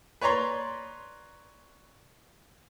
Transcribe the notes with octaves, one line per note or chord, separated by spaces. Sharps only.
B4 C#5 D5 A#5 C6